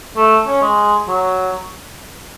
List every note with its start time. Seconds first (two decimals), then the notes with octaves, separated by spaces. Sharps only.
0.16 A3
0.47 C#4
0.62 G#3
1.08 F#3